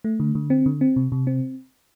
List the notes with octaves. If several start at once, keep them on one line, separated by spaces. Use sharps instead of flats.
A3
D3
D3
C4
D3
C4
C3
C3
C4